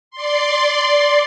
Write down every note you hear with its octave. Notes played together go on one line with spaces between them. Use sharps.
D5 C6